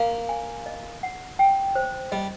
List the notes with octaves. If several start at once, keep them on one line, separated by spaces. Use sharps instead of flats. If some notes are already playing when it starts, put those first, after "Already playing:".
Already playing: A#3 F5
G#5
D#5
F#5
G5
C5
G3 D#5